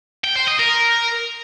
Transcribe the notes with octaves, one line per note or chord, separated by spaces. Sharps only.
G5
C5
D#5
A#4